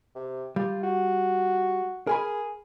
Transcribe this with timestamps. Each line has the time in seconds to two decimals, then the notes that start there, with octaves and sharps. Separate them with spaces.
0.15 C3
0.56 G3 F4
0.83 F#4
2.07 G#4 A#4 G#5 B5